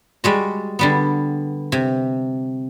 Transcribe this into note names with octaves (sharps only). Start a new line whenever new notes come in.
G3 G#3 F#4
D3 G3 B3
C3